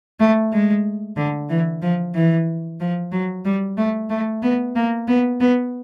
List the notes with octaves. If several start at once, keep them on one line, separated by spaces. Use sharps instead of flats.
A3
G#3
D3
E3
F3
E3
F3
F#3
G3
A3
A3
B3
A#3
B3
B3